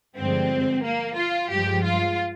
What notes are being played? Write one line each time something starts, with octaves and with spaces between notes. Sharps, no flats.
G2 D3 F3 G#3 C4
A#3
F4
G2 F3 G#3 G4
F4